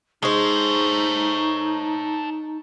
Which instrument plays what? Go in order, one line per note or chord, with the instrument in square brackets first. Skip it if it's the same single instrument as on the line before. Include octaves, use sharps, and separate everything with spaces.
[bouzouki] G#3 C5 [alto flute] D#4 [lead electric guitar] A4 C#5